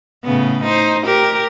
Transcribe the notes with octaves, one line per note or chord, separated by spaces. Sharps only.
A2 C#3 B3
D#4 C5
G4 A#4